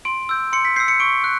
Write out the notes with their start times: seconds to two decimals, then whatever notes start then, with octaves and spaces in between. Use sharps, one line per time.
0.05 C6 D7
0.29 E6 G6
0.53 C6 C#7
0.65 B6
0.76 E6 G6 C7
0.88 C#7
1.00 C#6 D7
1.24 F#6